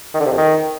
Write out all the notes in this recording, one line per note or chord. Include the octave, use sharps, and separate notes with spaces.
D#3
D3
C3
F2
D#3